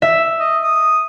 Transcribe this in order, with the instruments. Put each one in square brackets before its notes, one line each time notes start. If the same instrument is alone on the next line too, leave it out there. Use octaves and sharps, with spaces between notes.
[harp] E5
[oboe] D#5
D#6